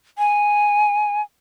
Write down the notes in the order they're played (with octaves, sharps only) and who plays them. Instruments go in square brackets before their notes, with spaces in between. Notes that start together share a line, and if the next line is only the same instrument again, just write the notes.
[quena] G#5